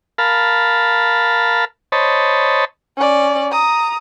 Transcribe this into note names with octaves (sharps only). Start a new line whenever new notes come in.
A#4 F5 A5 B5
C5 C#5 D#5 A5 B5
C#4 D5
A#5 D#6